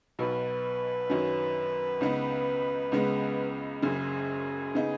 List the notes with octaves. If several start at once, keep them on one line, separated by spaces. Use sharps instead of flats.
B1 B2 F#3 D#4 B4
F#2 D#3 F#3 C#4
C#2 C#3 B3 D#4
C#2 C#3 G#3 B3
F#1 F#2 C#3 G#4
C#3 B3 D#4